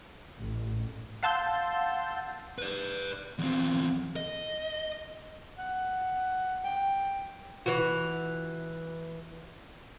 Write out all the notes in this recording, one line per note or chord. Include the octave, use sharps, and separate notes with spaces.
A1
F5 F#5 A5 C6 E6 G6
B4 D5
E2 C4
D#5
F#5
G5
E3 F#4